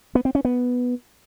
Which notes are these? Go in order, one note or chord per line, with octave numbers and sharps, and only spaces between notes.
B3
C4
C#4
B3